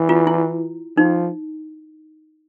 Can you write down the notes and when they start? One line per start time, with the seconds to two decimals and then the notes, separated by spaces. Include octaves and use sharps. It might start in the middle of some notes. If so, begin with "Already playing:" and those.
Already playing: E3
0.09 F4
0.27 E4
0.97 F3 D#4